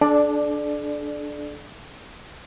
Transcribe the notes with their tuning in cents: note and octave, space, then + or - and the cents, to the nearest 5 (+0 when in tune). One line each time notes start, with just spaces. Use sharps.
D4 +0 A4 -40 D5 +15